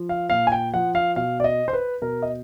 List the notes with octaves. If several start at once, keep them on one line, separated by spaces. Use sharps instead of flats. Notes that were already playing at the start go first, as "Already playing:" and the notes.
Already playing: F3
F5
A#2 F5
G#5
G5
F3 F#5
F5
B2 F5
D5
D#5
C5
B4
B2 A#4
D#5